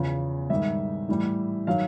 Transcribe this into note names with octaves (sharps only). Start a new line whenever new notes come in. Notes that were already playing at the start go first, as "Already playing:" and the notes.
Already playing: E2 C#3 F3
G#2 D#3 G3 E5
A2 E3 G3
D#3 F#3 F5